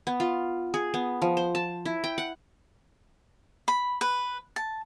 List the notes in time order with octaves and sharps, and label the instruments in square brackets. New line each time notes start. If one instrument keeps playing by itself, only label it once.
[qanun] B3
F4
G#4
B3
F3
C5
A5
E4
G5
F#5
[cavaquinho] B5
B4
A5